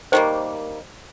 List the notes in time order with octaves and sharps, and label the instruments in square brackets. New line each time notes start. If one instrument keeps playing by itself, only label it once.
[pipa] D#3 G3 A#3 [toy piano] C5